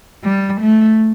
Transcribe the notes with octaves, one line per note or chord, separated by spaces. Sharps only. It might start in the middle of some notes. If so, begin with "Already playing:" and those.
G3
A3